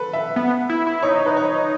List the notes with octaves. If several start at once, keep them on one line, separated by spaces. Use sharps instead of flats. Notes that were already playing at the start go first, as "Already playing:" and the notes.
Already playing: A4 B4
E5
B3
E4
E4
D#4 C#5
B4
C#5